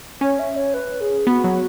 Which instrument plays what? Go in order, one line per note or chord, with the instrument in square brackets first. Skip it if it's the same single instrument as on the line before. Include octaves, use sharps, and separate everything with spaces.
[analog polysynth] C#4 [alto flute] C#5
[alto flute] E5
C#5
B4
G#4
[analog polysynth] B3 [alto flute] F#4
[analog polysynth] F#3